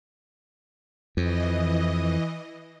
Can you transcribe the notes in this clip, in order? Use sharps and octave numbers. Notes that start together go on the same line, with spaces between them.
F2 E3 D#5